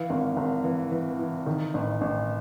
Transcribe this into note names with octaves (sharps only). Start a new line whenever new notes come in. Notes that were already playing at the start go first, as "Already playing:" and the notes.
Already playing: E3 F5
G#1
G#1
E3
E3
E3
D#3
A1
A1